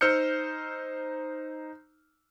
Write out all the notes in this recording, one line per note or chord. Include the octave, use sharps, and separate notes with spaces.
D#4 C5 E6 F6 G6 C#7